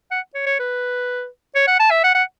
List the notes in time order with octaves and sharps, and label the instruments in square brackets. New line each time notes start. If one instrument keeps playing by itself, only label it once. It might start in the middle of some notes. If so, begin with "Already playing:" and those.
[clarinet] F#5
C#5
C#5
B4
C#5
F#5
A5
E5
F#5
F#5